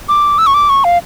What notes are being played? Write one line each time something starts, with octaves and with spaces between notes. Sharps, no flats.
D6
E6
C#6
D6
C#6
F5